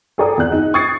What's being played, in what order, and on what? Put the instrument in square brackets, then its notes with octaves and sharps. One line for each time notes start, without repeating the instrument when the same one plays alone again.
[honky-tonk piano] G#4 A4 D5 G5 A#5 D#6
E2 F#6
D#4
C#6 D#6 G#6 A6 C7 C#7